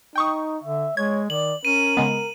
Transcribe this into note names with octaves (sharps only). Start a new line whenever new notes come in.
D#4 G5 C#6 D#6
D3 E5
G#3 C#5 G#6
D#3 D5 F#7
C#4 A#4 D#7
C#3 G#3 B3